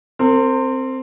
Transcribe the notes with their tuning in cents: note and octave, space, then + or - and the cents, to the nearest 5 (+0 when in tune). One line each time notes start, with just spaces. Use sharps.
C4 +0 A#4 -40